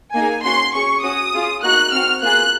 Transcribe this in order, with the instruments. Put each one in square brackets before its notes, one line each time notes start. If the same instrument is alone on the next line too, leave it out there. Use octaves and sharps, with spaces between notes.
[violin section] A#3 D#4 G#4 G#5
C#4 F#4 C6
C#4 G#4 C#6
C#4 F#4 D#6
C#4 F4 G#4
A#3 D#4 F#4 F#6
C4 F#4 F6
A#3 F4 G#4 F#6